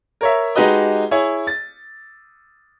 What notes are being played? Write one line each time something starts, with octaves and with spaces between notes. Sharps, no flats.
A#4 C#5 E5
G#3 D#4 F#4 G4 B4 D#5
E4 G#4 C#5
A6